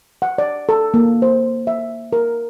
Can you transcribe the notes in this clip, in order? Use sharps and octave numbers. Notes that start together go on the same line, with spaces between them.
F#5
D5
A4
A#3
C5
E5
A#4